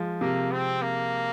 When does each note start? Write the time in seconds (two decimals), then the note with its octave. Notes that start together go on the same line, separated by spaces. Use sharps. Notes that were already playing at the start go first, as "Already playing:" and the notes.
Already playing: F3 G#3
0.21 C3 A#3
0.52 C4
0.82 A#3